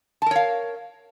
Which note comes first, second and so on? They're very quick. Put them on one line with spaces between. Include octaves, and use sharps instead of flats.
A5 A#4 C#5 F5